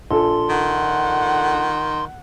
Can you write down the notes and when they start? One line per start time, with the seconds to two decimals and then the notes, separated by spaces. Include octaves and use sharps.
0.11 A#1 A4 C6
0.49 D#3 F#5